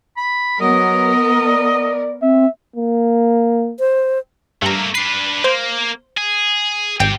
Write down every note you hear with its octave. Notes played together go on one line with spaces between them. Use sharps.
B5
F#3 B3 A#4 D#5
D5
C4 E5
A#3
C5
G2 A3 A#3 A#5
D4 B4 C7
A#3 C5
G#4
G#1 C4 G4 G5